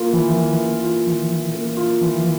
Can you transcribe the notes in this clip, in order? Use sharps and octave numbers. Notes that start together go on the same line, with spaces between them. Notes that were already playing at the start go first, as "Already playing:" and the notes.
Already playing: A#3 F4
E3
E3
A#3
F4
E3
E3
A#3
F4
E3
E3